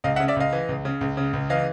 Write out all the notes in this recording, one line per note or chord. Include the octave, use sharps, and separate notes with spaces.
C#2 D#5 F5
E5 F#5
C#3
D5 E5
C#2 D#5 F5
E3
C#2
C#3
C#2
C#3
C#2
E3 D#5 F5